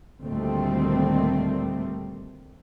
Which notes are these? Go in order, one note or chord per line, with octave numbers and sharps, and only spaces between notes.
D2 A#2 D#3 G3 A3 C4